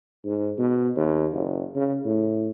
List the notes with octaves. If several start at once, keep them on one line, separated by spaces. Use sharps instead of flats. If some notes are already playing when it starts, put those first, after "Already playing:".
G#2
B2
D#2
F#1
C#3
A2